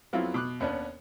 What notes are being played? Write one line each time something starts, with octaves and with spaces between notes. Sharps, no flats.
F2 F#3 B3 C4 E4 F4
B2 D6 F#6
D#2 B3 C#4 D4